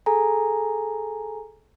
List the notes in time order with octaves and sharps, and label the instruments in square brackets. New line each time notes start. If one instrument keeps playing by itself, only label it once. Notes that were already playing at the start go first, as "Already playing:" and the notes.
[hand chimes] G#4 A4 G#5 A#5